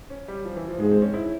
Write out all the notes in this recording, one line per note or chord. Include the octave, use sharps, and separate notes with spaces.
C#4
G3
F3
E3
F3
G#2 G#3
C4
C#4
E4